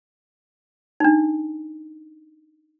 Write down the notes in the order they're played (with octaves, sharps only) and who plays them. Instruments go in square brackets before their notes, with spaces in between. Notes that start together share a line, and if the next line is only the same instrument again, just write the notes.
[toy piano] D4 D#4